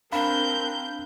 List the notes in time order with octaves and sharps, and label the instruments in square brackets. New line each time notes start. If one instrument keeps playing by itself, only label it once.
[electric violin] C4 G6 [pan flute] D4 [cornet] A#4 [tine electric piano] F5 B5